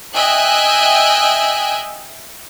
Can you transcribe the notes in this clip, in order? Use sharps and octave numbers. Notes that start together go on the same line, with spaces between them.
D#5 E5 G5 G#5 F#6